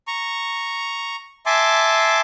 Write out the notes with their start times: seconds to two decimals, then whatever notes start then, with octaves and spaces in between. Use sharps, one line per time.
0.07 A#5 C#6
1.46 E5 G#5 A5 C6 D6